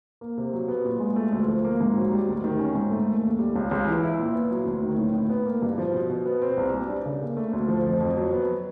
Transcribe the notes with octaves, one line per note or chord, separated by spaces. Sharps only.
A#3
C3
F#3
B3
A#2
G#3
A3
D2
F3
A#3
G#2
F#3
G3
D2
D#3
C#4
G#2
A3
A#3
D#2
G3
C#2
C#2
E3
E4
A#2
B3
F#3
D2
D#3
A2
A2
B3
A#3
G2
F3
B2
B2
B3
C4
C2
G3
D4
C#3
A#3
A3
D2
F3
F2
F2
F#3
B3